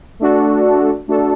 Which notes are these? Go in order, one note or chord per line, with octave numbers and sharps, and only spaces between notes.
A3 D4 F#4 A4
A3 D4 F#4 A4